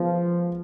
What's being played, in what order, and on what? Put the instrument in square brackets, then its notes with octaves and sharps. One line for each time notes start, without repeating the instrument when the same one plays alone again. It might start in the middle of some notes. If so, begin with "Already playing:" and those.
Already playing: [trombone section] F3 [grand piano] G#3 B3